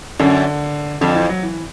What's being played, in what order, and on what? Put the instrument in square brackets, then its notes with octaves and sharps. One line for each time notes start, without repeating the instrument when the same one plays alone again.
[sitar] F#2 [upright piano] D3
[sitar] F2 [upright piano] D3
[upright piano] E3
F#3
E3